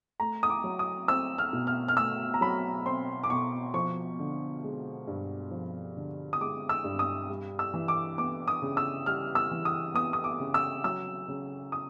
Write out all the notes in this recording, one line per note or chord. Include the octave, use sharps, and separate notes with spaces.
A3 A#5
D#6
D6
F#3
D#6
C4 E6
F6
B2
F6
F6
A3 E6
A#5
F#3 B5
C4 C6
D6
B2 C#6
F3 C#6
D3
G#3
G2
F3
D3
D#6
G#3 D6
E6
G2
D#6
G3
E6
E3
D6
B3 D6
D#6
C#3
E6
G3 F6
E6
E3
D#6
B3 D#6
D#6
D6
C#3
E6
F#3 E6
C#3
D#6